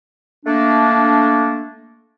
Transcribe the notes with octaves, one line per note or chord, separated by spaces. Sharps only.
A3 A#3 D4